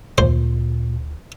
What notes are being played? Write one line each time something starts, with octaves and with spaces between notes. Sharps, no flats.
D2 A#2 C5